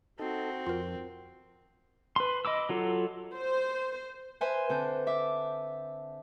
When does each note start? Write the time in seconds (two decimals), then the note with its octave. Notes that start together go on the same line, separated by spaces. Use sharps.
0.19 C4 D#4 F#4 A4
0.67 F2 F4 A#4
2.16 B4 C6
2.45 D#5 B5 D6 E6
2.69 F#3 F4 A4
3.37 C5
4.41 B4 C5 E5 G#5 C6
4.69 D3 C4 B4 G6
5.07 E5 D6